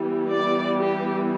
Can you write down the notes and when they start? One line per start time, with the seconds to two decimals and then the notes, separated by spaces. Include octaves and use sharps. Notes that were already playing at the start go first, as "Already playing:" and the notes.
Already playing: E3 G3 B3
0.30 D5
0.78 G4